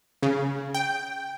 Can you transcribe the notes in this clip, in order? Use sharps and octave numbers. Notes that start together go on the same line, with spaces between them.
C#3
G5